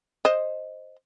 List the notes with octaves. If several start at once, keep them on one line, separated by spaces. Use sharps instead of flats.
C5 D#5